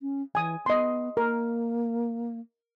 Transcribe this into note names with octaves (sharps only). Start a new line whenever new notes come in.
C#4
E3 G#5 D#6
B3 D#5 C6
A#3 A#4